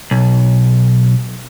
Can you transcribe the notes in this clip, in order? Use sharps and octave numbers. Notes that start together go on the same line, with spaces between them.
B1